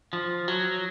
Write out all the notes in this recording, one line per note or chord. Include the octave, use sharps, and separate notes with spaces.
F3
F#3